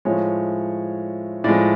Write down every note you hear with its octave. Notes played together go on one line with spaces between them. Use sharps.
A2 F3 G#3 C#5
A2 F3 G#3 D5